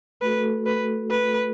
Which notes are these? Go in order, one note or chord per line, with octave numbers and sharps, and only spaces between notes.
A3 F#4 A4 B4
B4
B4